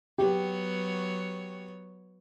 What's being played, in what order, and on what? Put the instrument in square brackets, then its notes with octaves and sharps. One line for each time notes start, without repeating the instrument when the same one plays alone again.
[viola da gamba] F#3 B3 C#5 [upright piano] G4